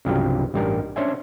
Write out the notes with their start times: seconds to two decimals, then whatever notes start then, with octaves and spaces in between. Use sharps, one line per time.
0.05 C2 G2 C#3 F3 F#3 G4
0.54 A1 G2 G3 D#4 A#4
0.96 C#4 D4 C5 C#5 E5 G#5